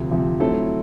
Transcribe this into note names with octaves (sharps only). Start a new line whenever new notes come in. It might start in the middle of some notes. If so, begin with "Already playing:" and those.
Already playing: D2 C3 F3
D2 C3 F3
F#3 A3 C4 E4 A4